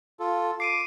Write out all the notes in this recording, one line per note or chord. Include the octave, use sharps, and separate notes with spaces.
F4 A4
D6 C7 D7 D#7